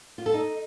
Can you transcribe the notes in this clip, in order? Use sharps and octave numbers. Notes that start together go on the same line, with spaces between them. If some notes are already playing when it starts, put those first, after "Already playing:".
F4
A4
D#4